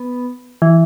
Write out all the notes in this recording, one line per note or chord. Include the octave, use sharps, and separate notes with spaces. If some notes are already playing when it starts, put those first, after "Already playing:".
Already playing: B3
E3